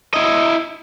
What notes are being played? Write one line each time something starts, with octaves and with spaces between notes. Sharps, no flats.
E4 D#5